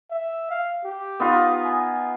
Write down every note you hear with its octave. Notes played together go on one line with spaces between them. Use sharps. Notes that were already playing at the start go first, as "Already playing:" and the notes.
E5
F5
G4
B3 D#4 F4
G#5